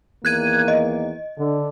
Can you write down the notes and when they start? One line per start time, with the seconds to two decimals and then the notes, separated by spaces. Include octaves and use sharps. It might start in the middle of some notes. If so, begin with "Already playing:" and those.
0.25 E2 D#3 A#3 F#6 G#6 D#7
0.68 D#5
1.38 D3